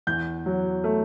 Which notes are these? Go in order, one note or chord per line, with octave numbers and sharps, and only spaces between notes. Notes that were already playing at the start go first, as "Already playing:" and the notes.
E2 G6
F#3
A3